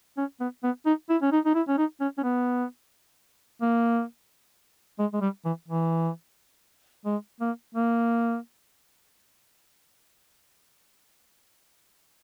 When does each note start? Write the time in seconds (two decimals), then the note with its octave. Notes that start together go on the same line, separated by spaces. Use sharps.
0.17 C#4
0.40 B3
0.63 B3
0.86 D#4
1.09 E4
1.22 C#4
1.32 D#4
1.45 D#4
1.55 E4
1.68 C#4
1.78 D#4
2.00 C#4
2.18 C#4
2.23 B3
3.61 A#3
4.99 G#3
5.13 G#3
5.21 G3
5.45 E3
5.68 E3
7.06 G#3
7.41 A#3
7.75 A#3